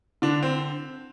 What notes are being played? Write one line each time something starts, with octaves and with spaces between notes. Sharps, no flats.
D3 D4
C4